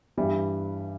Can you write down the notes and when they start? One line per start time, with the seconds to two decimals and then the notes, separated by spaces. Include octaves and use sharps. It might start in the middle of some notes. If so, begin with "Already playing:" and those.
0.17 G2 E3 G3